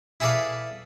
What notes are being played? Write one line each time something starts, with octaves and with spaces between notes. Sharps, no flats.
E4 G#4 A4 B4 D5 F5